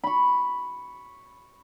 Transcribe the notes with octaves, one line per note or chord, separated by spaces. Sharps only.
B5 C#6